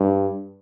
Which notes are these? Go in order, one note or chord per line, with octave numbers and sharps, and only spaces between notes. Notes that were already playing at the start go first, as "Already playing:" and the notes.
Already playing: G2